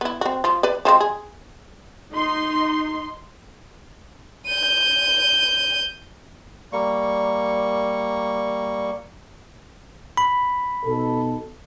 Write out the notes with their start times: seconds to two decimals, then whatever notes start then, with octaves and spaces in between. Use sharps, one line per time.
0.01 B3 E4
0.21 C4 F#4
0.44 F3 F4
0.63 B4 D5
0.85 F3 G#3 C4
1.00 G#4
2.12 D#4 C6
4.47 G6 D#7
6.73 G3 A#3 C#6
10.17 B5
10.84 B2 D#4 A4